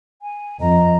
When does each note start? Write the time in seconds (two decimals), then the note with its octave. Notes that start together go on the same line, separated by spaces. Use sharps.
0.22 G#5
0.61 F2 D#5 A#5